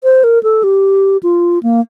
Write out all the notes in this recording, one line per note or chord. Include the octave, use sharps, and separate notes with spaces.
C5
A#4
A4
G4
F4
A#3